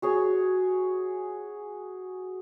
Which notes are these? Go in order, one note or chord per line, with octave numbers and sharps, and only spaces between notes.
F#4 G#4 C#5